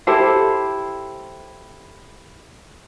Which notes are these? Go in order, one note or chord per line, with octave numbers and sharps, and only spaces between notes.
E4 G4 A4 C5